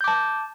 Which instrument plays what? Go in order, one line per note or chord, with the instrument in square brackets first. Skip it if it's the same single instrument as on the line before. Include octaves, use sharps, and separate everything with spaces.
[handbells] G6
D6
A5